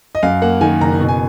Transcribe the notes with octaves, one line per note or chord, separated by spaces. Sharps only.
D#5
F#2 F5
A#3 F#5
D#3 G#5
F#1 A#5
B2
G#5